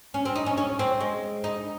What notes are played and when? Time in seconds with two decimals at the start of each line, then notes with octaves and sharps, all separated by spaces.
0.14 C#4
0.25 C4
0.35 D#4
0.46 C#4
0.57 C#4
0.79 C4
1.00 G#3
1.44 D#4